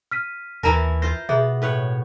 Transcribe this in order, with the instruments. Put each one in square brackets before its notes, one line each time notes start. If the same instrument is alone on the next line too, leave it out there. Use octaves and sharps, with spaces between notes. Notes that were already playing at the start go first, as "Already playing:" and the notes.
[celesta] F6 B6 D#7
[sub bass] D#2 [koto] E3 E4 A#4 [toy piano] A5 A#5
[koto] F4 C5 [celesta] A#6
[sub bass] B2 [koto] B3 [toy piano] G#4 E5
[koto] A2 B4 C#5